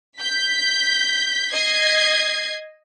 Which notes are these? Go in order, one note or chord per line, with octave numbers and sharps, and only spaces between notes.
G6 B6
D#5 G#6 C7